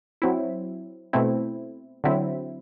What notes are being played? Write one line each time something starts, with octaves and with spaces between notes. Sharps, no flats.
F#3 C4 E4
B2 A3 C4 E4
D3 F#3 C4 E4